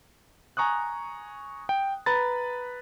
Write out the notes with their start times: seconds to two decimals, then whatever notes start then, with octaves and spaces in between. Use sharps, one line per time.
0.57 G#5 A#5 C#6 D#6 F#6
1.69 G5
2.06 B4 A#5 B5 A6